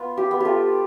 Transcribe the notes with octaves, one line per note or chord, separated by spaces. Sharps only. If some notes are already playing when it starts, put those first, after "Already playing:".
Already playing: B3 F4
G4
B3
F4 G4 A4